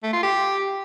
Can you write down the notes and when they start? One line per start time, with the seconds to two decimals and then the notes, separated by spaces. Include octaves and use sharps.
0.03 A3
0.13 F4
0.23 G4